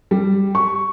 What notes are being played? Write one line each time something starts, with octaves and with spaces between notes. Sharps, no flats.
G3
C#6